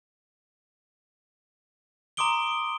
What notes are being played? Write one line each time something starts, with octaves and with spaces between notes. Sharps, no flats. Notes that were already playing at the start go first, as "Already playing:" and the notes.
A#5 C6 D6 D#6 D7 G7